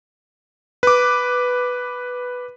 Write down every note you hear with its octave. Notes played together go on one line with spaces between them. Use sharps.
B4 D6